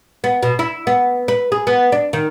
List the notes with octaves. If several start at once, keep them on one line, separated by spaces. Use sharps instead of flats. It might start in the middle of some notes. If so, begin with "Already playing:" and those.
B3
B2
E4
B3
B4
G#4
B3
D4
D#3